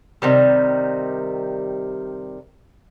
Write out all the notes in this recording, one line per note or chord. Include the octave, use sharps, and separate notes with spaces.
C3 D#3 G3